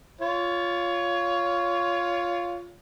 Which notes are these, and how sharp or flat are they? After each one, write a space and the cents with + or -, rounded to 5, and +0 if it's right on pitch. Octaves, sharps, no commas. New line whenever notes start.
F4 +0 C#5 +20